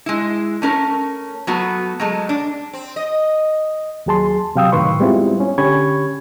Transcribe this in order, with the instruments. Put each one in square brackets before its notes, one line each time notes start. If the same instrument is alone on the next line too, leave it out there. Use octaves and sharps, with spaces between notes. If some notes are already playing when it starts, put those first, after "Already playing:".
[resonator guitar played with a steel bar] G#3 E4
A3 C#4 A#4
F#3 A3 B3 F#4
F#3 G#3 A3
D4
[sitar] C4
D#5
[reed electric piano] D#2 F#3 G#4 A5 C6
C3 F#3 F5 G5 D#6 E6
F#2 A2 D#3 B4 C6 C#6
G3 G#3 B3 C4 E4 F4
C#4
D3 C#4 G4 B5 C#6 G#6